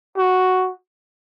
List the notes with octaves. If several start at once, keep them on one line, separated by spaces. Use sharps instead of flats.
F#4